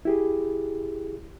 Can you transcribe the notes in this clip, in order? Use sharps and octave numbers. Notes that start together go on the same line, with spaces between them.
E4 G4 G#4